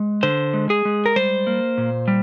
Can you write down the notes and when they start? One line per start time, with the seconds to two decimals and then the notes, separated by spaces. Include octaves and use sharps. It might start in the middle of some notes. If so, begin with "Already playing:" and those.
Already playing: G#3
0.23 D3 C5
0.54 G#3
0.70 G#4
0.85 G#3
1.06 A#4
1.16 G3 C5
1.47 A#3
1.78 A#2
2.08 G3